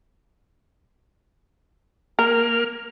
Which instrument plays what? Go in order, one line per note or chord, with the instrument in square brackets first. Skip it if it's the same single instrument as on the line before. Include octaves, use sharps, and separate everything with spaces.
[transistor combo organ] A#3 F6 [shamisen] A#4